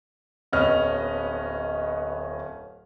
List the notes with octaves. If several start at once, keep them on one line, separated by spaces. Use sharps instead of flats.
D1 B3 C#4 D#5 F6 F7